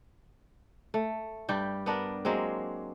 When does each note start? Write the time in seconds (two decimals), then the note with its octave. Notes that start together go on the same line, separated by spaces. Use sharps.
0.94 A3
1.49 G2 G3 G4
1.86 B3 D4 A#4
2.25 F#3 G#3 A#3 C4